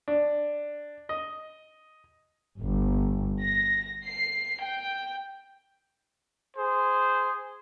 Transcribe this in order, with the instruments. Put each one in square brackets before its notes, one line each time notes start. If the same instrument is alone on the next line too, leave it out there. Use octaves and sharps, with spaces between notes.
[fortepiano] D4
D#5
[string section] G1
A#6
C7
G5
[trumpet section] G#4 C5